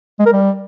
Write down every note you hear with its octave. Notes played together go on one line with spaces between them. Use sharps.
G#3
A#4
G3